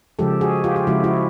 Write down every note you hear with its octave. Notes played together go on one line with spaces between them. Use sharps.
C#3 F3 G#3 G4 A4
F#4 G#4
F4 G4
G4
C#3 F3 G#3 E4 F#4
E4 F#4